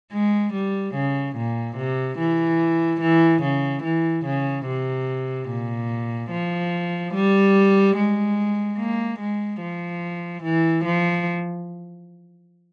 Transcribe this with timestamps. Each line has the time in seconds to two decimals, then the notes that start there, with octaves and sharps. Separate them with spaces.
0.12 G#3
0.53 G3
0.94 C#3
1.36 A#2
1.77 C3
2.18 E3
3.01 E3
3.42 C#3
3.83 E3
4.25 C#3
4.66 C3
5.48 A#2
6.31 F3
7.14 G3
7.96 G#3
8.78 A#3
9.19 G#3
9.61 F3
10.43 E3
10.85 F3